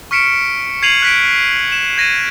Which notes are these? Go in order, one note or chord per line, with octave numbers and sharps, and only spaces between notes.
C#6 F6 B6 C#7 D7 E7
G#6 C7 D#7 F7 F#7
F#6 B6 D7
E7
G#6 A#6 D#7 E7